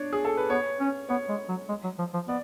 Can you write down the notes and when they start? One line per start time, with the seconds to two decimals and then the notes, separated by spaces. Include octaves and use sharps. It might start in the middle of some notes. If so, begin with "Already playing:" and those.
Already playing: D4 C#5
0.13 G#4
0.25 A4
0.37 B4
0.50 B3 C#5
0.80 C#4
1.09 B3 C#5
1.29 G#3
1.49 F#3
1.69 G#3
1.84 F#3
1.98 F3
2.14 F3
2.28 B3 D5